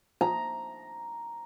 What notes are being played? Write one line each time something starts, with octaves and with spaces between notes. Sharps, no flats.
A#5